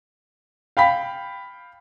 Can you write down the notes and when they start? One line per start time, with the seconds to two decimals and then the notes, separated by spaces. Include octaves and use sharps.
0.77 F5 G5 B5 B6